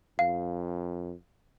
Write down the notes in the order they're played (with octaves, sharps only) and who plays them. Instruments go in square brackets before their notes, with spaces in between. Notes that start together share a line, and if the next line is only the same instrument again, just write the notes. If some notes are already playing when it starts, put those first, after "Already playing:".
[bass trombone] F2 [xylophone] F5